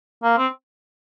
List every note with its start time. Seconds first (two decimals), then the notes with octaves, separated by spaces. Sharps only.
0.23 A#3
0.38 C4